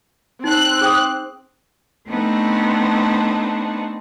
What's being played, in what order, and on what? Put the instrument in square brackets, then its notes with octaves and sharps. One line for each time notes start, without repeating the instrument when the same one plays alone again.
[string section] C4 F#6 [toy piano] D#4
[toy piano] G#4 G5 D#6
[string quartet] A3 B3 C4 D4 D#4